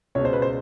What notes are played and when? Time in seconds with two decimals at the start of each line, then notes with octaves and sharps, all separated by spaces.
0.15 C#2 B2 C#5
0.25 C5
0.33 B4
0.42 C5